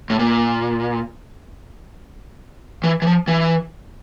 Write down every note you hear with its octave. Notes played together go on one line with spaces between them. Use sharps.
A2
A#2
E3
E3
F3
E3